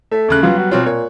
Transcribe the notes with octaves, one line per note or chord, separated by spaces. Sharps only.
A3 E5
D#2 C#3 F#6
F#3 G3 B3 F4
F#4
B2 F#3 C4 F4
A#2 C#5